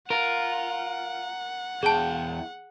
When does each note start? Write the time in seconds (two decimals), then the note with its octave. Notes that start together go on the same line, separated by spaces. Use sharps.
0.10 F4 A#4 F#5
1.83 E2 G#4 G5 A5